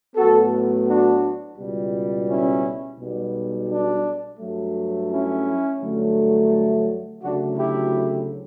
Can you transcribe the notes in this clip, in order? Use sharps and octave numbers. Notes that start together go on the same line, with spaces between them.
A2 F#3 B3 F#4 A4
D4 F#4
C#2 B2 G3
C#4 E4
B1 B2 G3
D4
G2 F#3 A3
C#4 E4
G2 D3 F#3 A3
D2 C#3 F#3 A3 D4 F#4
E4 G4